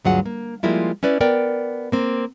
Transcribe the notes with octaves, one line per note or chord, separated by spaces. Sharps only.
D2 G2 F#3 F4 G#4 F#5
A#3
F3 G3 G#3 A#3 E4 F4
C#4 E4 B4 D5
B3 A#4 D5 G5
A#3 C4